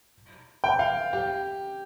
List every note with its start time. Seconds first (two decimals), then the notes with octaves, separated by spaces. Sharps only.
0.64 G5
0.79 F5
1.13 G4